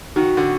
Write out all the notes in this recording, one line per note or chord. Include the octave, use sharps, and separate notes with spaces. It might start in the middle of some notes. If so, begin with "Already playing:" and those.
D#3 F#4
D3